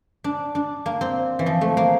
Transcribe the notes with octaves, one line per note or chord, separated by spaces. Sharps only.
D4
D4
A#3
C4
E3
F3
A3
A#3